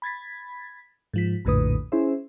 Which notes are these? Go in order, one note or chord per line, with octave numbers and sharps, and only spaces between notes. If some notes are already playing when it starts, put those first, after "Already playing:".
B5 G#6 A6 B6
G#2 F3 B6
A#1 F2 A2 D3 B4 D#6
C#4 E4 G#4 C5 E5